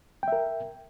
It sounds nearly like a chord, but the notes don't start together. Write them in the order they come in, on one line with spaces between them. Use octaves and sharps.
G5 E5 A#4